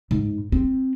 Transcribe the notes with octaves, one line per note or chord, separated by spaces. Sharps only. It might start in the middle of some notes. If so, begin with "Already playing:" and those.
G#2
C4